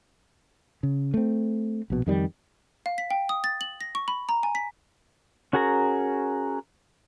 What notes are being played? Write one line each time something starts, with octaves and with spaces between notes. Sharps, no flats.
C#3
A3 C4
A#1 B2
F2 D#3 G3
F5
B6
G5
D#6
A6
F#7
A#6
C#6
B5
A#5
G#5
B6
C#4 F#4 G#4 A#4 A#5